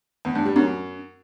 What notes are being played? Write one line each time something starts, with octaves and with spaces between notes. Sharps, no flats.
E2
G2
G3
F#2